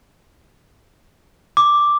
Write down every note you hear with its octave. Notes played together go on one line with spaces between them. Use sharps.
D6